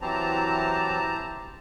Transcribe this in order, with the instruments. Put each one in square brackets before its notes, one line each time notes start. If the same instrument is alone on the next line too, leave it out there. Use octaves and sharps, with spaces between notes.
[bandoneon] E3 F#3 C4 [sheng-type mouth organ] E4 G4 C5 [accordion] A5 A#5